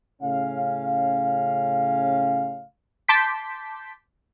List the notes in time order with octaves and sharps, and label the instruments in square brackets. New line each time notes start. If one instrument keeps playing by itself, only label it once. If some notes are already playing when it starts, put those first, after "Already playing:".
[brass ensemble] A2 C#3 C#4 F5
[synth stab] A5 C6 D6 G6 B6